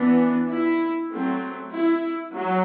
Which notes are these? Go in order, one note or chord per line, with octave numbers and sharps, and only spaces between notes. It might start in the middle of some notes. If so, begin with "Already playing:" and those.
Already playing: E3 B3 D4
E4
F#3 A3 C4
E4
F#3